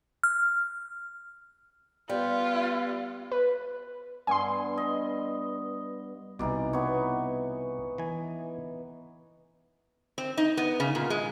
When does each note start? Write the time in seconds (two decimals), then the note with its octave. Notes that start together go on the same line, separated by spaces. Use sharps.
0.23 F6
2.09 G3 B3 F4
3.32 B4
4.27 G2 B3 G#5 C6
4.77 D#5
6.39 C2 B2 E3 D#4 D5
6.73 B3 C#5
7.98 E3 G#5
10.18 C4
10.38 D#4
10.57 B3
10.80 C#3
10.95 A#2
11.10 G#3